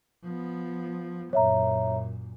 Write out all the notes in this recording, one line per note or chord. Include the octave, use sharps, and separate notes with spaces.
F3 B3
F#2 A#2 C#5 E5 A#5